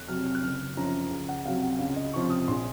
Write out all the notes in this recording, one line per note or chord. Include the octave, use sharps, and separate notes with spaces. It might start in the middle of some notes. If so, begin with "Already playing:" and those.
Already playing: F2 F#6
C3 F#3 F6
F6
F#6
F#1 F6
F#2 F3 A#5
C#2
F#5
C3 F#3 F5
F#5
C#2 F5
D#5
C3 F3 C#6
D#6
A#1 C6